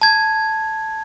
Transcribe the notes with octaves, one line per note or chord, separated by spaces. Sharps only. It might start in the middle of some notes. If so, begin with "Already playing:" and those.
A5 G#6